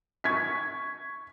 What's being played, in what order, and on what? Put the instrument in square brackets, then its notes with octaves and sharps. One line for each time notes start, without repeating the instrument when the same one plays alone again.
[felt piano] C#6 G#6 B6